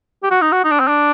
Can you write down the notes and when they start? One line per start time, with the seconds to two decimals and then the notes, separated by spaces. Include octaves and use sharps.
0.23 G4
0.31 F#4
0.41 D#4
0.52 F#4
0.64 D#4
0.72 D4
0.80 C4
0.88 D4